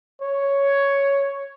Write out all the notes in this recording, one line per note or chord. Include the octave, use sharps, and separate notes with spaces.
C#5